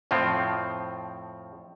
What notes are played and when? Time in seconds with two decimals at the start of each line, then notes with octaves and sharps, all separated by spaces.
0.11 F2 A2 F3 C4